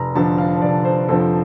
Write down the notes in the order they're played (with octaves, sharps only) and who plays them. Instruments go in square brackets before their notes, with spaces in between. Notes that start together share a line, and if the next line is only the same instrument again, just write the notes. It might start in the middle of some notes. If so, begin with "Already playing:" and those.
Already playing: [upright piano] F1 A#5
F2 D3 F3 A5
F5
C5
F1 D5
C5
F2 D3 F3 A4